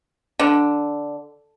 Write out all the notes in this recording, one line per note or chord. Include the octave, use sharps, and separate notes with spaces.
D3